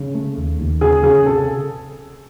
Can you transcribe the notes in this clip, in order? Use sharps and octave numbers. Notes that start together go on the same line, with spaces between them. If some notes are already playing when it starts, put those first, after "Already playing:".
Already playing: C#3
A3
D#2
D#2
C#3 G#4
C#3 G#4
C3 A4